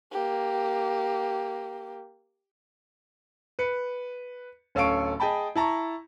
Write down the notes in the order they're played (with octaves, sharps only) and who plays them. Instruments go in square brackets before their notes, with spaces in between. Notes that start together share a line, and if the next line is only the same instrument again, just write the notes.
[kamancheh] A#3 G4
[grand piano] B4 C#7
D1 C#4 A4 F5 C#6 D7
G#4 D#5 G5 A5 B5
E4 A5 A#5 C#6